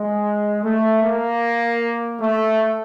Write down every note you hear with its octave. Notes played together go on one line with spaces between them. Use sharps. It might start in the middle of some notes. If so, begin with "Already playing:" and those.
Already playing: G#3
A3
A#3
A3